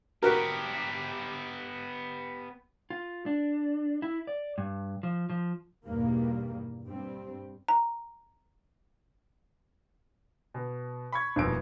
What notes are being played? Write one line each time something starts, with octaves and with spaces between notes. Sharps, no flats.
B3 F#4 G4 A#4
F4
D4
E4
D5
G2
F3
F3
E2 G2 B2 D#3 G3 A#3
G2 G3 C4
A#5
B2
B5 C#6 G#6
D#1 F2 B2 D7